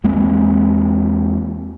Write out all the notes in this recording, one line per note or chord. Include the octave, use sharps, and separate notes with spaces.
E2 G#3 A#3 C4